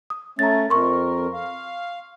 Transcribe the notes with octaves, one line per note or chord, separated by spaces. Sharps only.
D#6
A3 C#4 A#5 A6
F2 A#4 C6 C#6
F5